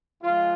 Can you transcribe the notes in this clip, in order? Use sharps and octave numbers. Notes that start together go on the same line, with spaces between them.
G#2 F3 G#3 F4